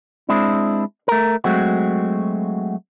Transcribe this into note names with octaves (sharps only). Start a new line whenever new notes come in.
G#3 C4 D4 E4
A3 A#4
F#3 G#3 A3 C4 F#4